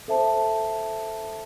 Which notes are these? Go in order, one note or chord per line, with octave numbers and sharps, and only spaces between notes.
A4 C5 E5 A5